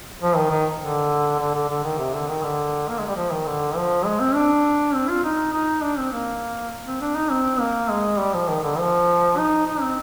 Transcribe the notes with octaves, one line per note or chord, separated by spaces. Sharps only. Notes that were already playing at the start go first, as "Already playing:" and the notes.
F3
D#3
D#3
D3
D3
D3
D3
D#3
C3
D3
D#3
D3
A#3
G#3
G3
F3
D#3
D3
F3
G#3
C4
D4
C4
F4
D#4
D#4
D4
C4
A#3
C4
D4
D#4
C4
A#3
G#3
G3
F3
D#3
D3
F3
D#4
D#4
C4